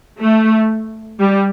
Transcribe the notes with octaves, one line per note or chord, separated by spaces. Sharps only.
A3
G3